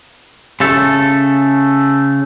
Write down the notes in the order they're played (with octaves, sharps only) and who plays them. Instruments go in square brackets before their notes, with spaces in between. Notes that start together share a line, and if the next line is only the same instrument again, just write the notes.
[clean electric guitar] C#3 A3 A4